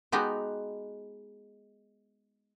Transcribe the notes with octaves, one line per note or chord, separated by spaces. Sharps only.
G#3 B3 D#4 F#4 G4